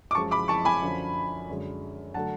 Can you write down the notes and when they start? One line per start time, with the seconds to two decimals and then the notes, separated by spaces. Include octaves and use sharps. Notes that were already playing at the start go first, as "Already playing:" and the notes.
0.11 D6
0.15 F#2 F3 G#3 A5 C#6
0.31 B5 D6
0.48 A5 C#6
0.65 G#5 B5
0.82 F#2 D3 F3
1.49 F#2 D3 G#3
2.14 D3 F#3 A3 F#5 A5